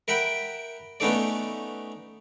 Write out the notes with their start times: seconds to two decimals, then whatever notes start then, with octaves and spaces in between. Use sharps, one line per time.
0.08 A#4 E5 F#5 G5 B5
1.00 A3 B3 C#4 D#4 A4 D5